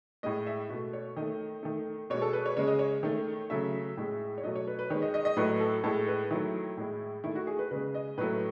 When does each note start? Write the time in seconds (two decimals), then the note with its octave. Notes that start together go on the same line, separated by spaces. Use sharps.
0.23 A2 G#3 D#5
0.47 E5
0.69 B2 A3
0.93 C#5
1.17 D#3 A3 D#5
1.63 D#3 A3
2.10 B2 G#3 C#5
2.22 A4
2.33 B4
2.46 C#5
2.56 C#3 G#3 C#5
2.67 D#5
2.79 C#5
3.03 D#3 A3
3.50 C#3 F#3 A3 E5
3.97 A2 G#3
4.38 C#5
4.43 B2 F#3 A3 D#5
4.55 C#5
4.67 B4
4.79 B4
4.90 D#3 G#3 C#5
5.02 D#5
5.14 D#5
5.25 D#5
5.37 A2 F#3 A3 B4
5.60 A4
5.84 A2 G#3 A4
6.08 B4
6.30 D#3 F#3 A3 E4
6.77 A2 G#3
7.24 D#3 A3 E4
7.35 F#4
7.47 G#4
7.59 B4
7.71 C#3 G#3 B4
7.94 D#5
8.17 A2 F#3 A3 B4